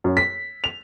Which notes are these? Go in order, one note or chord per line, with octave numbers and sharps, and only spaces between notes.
F#2
B6
F7